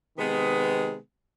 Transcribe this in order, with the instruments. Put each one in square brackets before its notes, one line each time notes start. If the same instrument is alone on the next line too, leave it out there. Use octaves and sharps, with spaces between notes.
[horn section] C3 D#3 G#3 B3